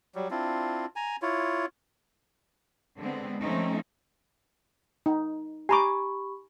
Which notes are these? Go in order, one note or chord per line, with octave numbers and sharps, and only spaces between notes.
F#3 G3
C4 D4 E4 F4
G#5 A#5
E4 F4 C#5
D3 G#3 B3 C4
F3 A3 C4 C#4 D#4
D#4
G4 G#5 A#5 B5 C#6 D6